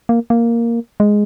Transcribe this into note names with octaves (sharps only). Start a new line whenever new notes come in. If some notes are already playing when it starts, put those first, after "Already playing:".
A#3
A#3
G#3